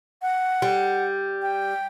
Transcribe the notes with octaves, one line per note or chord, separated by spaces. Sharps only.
F#5
G3
G5